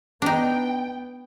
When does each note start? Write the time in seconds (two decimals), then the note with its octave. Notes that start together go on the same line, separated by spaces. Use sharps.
0.22 B3 D4 D#4 G5